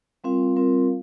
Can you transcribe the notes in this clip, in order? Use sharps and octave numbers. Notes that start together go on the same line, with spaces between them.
G3 C4 F4 A#4 F5
G3 C4 F4 A#4 F5